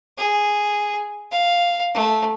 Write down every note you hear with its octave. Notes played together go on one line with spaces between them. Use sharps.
G#4
F5
A3